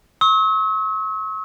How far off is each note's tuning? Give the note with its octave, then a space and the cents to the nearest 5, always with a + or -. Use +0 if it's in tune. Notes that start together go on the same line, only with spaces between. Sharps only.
C#6 -30 E6 -45